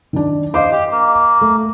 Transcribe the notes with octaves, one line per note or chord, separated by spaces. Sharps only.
D#3 D4
C5 D#5 F5 D6
G4
A#3
A3